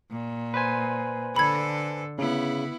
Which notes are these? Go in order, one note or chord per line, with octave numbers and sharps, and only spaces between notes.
A#2
B4 C5 G#5
D3 A4 B5 G#6
C#3 B3 E4